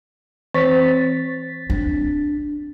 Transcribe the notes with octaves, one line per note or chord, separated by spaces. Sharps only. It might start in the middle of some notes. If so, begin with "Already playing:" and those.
E3 C4 C#5 A6 B6
D4